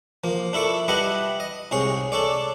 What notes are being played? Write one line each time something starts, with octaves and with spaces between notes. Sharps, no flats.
F3 A#3
D4 E4 A4 C#6 D6
G3 D4 E4 B4 D#5 F#5
D#5
C2 G#2 G#4 C#5
D4 A4 C#5 D5